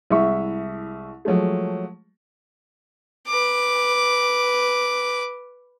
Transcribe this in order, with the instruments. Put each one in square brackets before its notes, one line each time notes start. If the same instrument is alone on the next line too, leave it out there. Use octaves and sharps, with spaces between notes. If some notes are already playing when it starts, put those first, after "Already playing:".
[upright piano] C2 G#3 E4 E5 C#6
F3 F#3 G#3 A3
[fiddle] B4 D6